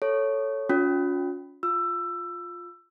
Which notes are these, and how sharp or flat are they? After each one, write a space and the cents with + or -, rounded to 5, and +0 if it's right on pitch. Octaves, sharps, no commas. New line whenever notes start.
A4 +0 C#5 +0
C#4 +35 F4 +45
F4 +10 E6 +20